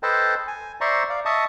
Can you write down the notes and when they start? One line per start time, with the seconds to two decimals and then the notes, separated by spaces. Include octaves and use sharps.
0.03 A4 B4 C5 D#5 G5 A5
0.48 G#5
0.81 C5 D5 E5 A#5 C6 C#6
1.10 D5 F5
1.25 D#5 E5 A5 C#6 D#6